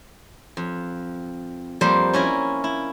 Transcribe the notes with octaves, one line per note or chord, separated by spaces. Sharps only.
F2
F2 G3 A#3 C5
C#4 E4 A#4 D5
E4